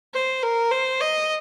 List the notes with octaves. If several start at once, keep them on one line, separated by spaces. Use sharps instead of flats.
C5
A#4
C5
D#5